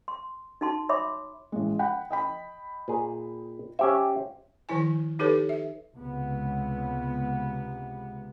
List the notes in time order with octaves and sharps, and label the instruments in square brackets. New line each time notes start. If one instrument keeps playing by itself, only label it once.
[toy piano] C6
D#4 F#4 A5 C6
C#5 E5 B5 C6 D6 D#6
[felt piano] A1 G#3
F#5 G5 B5
D#5 G5 B5
[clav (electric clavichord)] A#2 G#4
[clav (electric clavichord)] C#4 G4 E5 [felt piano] C5
[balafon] D#3 F3 E4 G#5
D#4 G4 A4 B4 C#5
E5
[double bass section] C#2 C3 B3